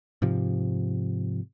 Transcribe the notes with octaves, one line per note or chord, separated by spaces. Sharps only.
G#2 C3 F3